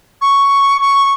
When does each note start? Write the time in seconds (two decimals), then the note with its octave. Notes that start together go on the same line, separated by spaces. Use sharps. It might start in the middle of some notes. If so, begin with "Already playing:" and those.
0.21 C#6
0.81 C#6